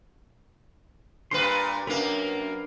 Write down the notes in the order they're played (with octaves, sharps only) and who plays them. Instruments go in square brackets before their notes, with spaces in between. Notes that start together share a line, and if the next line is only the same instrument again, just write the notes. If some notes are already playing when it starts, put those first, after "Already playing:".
[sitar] G2 A#2 B4 [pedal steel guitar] C6
[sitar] F#2 A#3 [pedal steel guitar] D4 A#4 B4